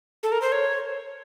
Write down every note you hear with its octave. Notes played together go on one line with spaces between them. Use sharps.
A4
A#4
C5
C#5